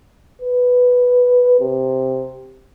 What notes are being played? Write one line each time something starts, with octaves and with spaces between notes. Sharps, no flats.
B4
C3